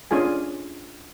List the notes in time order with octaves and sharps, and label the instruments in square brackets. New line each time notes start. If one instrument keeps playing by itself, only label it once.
[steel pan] C#4 D4 F4 G#4 G#5